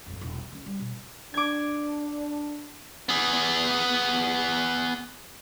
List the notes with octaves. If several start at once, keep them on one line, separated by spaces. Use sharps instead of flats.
G#1 F2
E1 C2
F#3
D2 C#4
G3
B2
D4 D6 G#6
B3 G#4